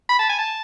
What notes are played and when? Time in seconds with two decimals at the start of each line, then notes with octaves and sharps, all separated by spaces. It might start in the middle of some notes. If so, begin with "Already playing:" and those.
0.09 B5
0.19 A5
0.29 G#5
0.39 A5